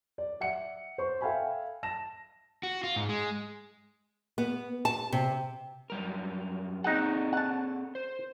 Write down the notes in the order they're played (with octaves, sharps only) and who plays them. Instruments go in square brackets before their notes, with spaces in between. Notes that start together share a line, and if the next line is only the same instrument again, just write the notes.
[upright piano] D5
E5 F#5 C#7
C5 C#6
A4 E5 F5 G5 G#5 B5
A5 A#6 E7
[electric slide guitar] F#4
F4
G#2
G#3
[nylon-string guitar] B3
A5
C3
[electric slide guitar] F#2 G3 A#4
[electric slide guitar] C4 G#4 A4 [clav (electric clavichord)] D#4 F#5
[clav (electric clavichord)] F#5 A5
[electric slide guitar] C5